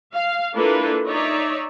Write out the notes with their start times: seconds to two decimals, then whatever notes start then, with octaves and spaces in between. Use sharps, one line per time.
0.14 F5
0.54 A#3 D4 E4 F4 A4 B4
1.07 D#4 C#5 D5 E5